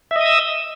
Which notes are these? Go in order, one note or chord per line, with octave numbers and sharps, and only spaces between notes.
D#5 E5 D#6 E6